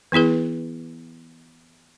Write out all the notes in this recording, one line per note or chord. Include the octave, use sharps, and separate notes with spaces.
E3 B3 E4 G#4 B4